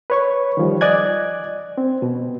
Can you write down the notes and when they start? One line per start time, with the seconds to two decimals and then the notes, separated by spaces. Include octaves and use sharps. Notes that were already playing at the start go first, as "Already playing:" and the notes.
0.10 B4 C#5 C#6
0.57 D#3 F3 G3
0.81 D5 D#5 G#5 F#6 G#6
1.78 C4
2.02 B2